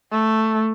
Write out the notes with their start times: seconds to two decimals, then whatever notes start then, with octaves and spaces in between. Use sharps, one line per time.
0.12 A3